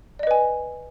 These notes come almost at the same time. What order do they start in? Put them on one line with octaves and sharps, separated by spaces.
D5 D#5 B4 G#5